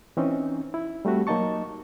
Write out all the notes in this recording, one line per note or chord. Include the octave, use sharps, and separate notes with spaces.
E3 C4 C#4 D#4
E4
G3 A3 C4 F#4 G4
F#3 A#3 D#4 D#5 A5 C#6